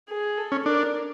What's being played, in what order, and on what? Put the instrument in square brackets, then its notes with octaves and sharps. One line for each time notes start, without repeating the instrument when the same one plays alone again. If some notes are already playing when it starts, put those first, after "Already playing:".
[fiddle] G#4
A4
[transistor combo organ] C#4
[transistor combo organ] D4 [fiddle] A#4